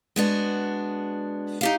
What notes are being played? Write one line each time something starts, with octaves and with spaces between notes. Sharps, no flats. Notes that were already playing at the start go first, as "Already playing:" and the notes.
G#3 B3 D4 F#4
D#4 G4 F5